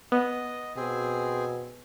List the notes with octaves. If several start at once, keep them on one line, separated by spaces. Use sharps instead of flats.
B3 D#5
B2 C4 G#4